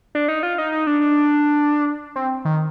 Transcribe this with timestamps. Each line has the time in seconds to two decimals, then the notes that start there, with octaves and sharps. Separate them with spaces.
0.15 D4
0.28 D#4
0.43 F4
0.58 D#4
0.72 D#4
0.87 D4
1.01 D4
2.16 C4
2.45 D#3